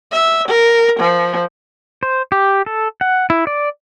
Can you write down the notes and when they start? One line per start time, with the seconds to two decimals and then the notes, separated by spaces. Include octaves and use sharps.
0.12 E5
0.48 A#4
1.00 F3
2.03 C5
2.32 G4
2.66 A4
3.01 F#5
3.30 E4
3.47 D5